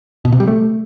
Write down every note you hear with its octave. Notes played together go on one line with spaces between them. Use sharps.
B2
C3
G3
A3